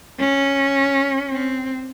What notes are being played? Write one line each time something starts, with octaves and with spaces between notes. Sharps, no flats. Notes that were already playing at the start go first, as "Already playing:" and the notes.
C#4
C4